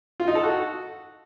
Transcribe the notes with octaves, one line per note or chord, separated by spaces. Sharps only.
F4
D#4
A4
F#4